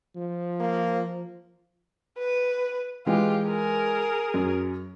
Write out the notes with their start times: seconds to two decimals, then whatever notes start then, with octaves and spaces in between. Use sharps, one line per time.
0.15 F3
0.60 A#3
2.18 B4
3.06 E3 G#3 F4 G4
3.46 G#4 A#4
4.34 F#2